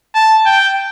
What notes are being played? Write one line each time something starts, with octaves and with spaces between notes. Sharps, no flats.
A5
G5